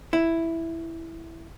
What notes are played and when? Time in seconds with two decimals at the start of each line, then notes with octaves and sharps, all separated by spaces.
0.13 E4